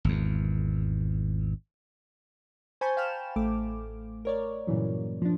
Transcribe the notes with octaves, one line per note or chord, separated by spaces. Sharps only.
G#1 E2
C5 G#5 A5 B5 C#6 G6
F5 G5 A5 B5 F6 E7
A1 A3 D6
A#4 C#5 D5
G2 A#2 C#3 E3 F#3
F3 D4